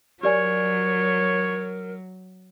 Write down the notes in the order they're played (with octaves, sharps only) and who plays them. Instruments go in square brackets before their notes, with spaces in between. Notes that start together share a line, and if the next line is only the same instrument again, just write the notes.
[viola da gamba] F#3 [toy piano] G4 D5 G#5 [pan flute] A#4 [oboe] C#5